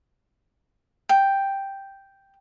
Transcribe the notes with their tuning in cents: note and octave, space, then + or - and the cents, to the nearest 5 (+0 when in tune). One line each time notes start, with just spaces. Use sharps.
G5 +0